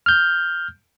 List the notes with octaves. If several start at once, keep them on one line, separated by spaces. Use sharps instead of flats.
F6 G6